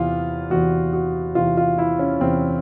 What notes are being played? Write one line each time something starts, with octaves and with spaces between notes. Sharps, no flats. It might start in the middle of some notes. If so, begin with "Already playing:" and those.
Already playing: E2 C3 E3 F4
E2 C3 E3 F#4
F#4
E2 C3 E3 F4
F4
E4
C#4
E2 C3 E3 C4